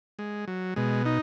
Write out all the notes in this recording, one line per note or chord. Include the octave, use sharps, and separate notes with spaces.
G#3
F#3
B2 G#3
D#4